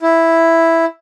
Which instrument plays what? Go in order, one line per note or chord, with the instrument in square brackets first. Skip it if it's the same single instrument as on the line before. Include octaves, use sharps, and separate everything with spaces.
[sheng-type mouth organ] E4